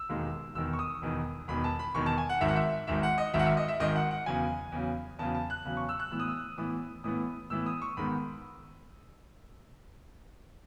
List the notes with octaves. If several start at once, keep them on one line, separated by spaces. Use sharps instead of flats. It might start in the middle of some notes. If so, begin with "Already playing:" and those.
Already playing: E6
E1 D#2 D#3 G#3 D#4
E1 E2 D#3 E6
C#6
D#6
E1 E2 D#3
E1 E2 D#3 B5
A5
B5
E1 E2 D#3 C#6
A5
G#5
F#5
G#1 G#2 D#3 E5
F#5
E5
G#1 G#2 D#3 E5
F#5
D#5
G#1 G#2 D#3 E5
F#5
E5
D#5
E5
G#1 G#2 D#3 D#5
F#5
F#5
E2 C#3 F#3 G#5
E2 C#3 F#3
E2 C#3 F#3 A5
A5
F#6
E2 C#3 F#3
C#6
E6
F#6
A2 E3 B3 E6
D#6
E6
A2 E3 B3 D#6
A2 E3 B3 D#6
A2 E3 B3 E6
D#6
C#6
G#2 D#3 G#3 B3 B5